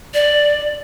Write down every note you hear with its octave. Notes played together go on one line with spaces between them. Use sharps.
D5